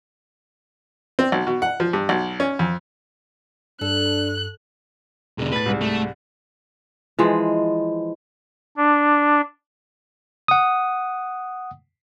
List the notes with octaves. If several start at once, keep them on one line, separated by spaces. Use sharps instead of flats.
C4
B1
B2
F#5
F3
G2
B1
C#4
F2
G2 D4 A4 F#6
E1 B2 D3
A2 B4 A6
C2 G#2
A3
E3 F3 G#3
D4
F#5 D#6